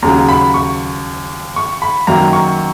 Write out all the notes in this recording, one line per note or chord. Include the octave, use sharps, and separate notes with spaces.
D#2 C#3 F#3 A#5
B5
C#6
C#6
B5
F#2 D#3 F#3 A#3 A#5
C#6